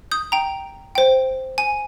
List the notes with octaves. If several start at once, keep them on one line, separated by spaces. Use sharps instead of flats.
D#6 G6
G5 A#5
C5 G5
G#5